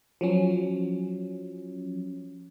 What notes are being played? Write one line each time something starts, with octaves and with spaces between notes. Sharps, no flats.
F3 F#3 C#4